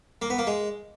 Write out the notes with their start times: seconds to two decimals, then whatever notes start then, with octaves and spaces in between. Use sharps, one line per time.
0.22 A#3
0.30 B3
0.38 A#3
0.47 G#3